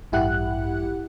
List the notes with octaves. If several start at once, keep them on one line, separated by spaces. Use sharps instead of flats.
A1 G2 E4 G4 F#5 F#6